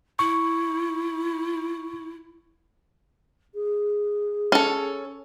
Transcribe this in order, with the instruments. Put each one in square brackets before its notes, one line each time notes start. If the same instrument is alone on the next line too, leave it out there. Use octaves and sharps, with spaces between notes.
[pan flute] E4 [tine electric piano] C#6
[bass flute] G#4
[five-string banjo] C#4 A4